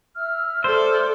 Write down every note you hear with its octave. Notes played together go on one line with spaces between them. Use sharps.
E5 E6 F6
A4 C5 D5